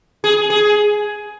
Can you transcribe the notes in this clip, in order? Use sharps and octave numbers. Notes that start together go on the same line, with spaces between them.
G#4
G#4